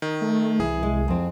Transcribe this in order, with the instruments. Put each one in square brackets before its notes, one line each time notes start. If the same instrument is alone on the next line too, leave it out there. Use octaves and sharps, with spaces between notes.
[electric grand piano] D#3
[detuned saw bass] A3
[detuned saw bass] C2 [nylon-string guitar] E3 [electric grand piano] G#4
[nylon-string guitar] G#3
F2 C4